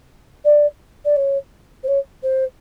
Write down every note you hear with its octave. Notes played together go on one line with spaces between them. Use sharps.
D5
D5
C#5
C5
C#5
C5